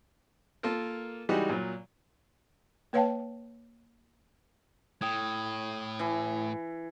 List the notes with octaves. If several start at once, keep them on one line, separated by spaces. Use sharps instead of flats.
A#3 F4 A4 A#4
E3 G3 G#3 D#4 F#4 G4
A#2 F#3
A#3 B4 C#5 F5 G5 A5
A2 G5 D#6 G#6
E3